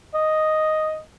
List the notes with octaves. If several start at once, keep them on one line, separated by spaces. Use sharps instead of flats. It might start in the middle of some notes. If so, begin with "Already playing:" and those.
D#5